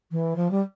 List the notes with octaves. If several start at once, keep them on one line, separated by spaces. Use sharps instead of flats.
E3
F3
G3